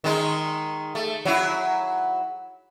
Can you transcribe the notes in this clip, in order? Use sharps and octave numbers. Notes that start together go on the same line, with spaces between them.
D#3 G#3 D#4
A3
F#3 E4